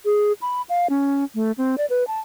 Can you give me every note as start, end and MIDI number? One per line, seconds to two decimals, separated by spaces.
0.05 0.33 68
0.42 0.62 83
0.69 0.87 77
0.90 1.24 61
1.35 1.52 57
1.58 1.76 60
1.78 1.86 74
1.90 2.06 71
2.07 2.20 81